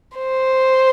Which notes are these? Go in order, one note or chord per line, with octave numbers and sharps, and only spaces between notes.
C5